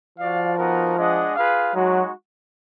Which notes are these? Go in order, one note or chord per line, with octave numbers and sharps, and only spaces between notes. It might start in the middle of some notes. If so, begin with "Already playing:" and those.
F3 F#4 D5 F5
B3 D#4 F#4 A#4
G#3 D4 G#4 D#5 F#5
F4 G#4 B4 F5
F#3 G#3 D#4 F#4